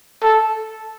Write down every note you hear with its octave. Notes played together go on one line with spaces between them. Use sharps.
A4